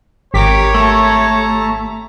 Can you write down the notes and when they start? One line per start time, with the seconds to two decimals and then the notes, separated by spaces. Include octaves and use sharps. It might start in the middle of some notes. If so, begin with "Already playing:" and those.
0.34 G#1 G4 A#4 C#5 D6 B6
0.74 A3 A5 A#5